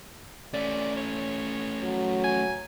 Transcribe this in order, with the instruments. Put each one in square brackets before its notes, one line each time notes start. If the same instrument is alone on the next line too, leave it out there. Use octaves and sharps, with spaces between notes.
[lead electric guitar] A3 C#4 [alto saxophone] D5
[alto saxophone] C#5
[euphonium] F#3
[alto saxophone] G#5